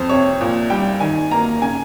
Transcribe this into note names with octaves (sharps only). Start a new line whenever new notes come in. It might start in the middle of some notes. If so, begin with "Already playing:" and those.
Already playing: F2 C5
C3 C#5
A#2
G3 G5
D#3 G#5
A#3 A#5
C#3 G#5